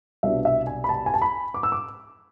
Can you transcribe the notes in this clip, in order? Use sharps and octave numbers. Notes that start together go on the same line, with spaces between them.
C2 B2 B3 D4 E5
E5
G#5
B5
A5
G#5
A5
B5
D6
E6
D6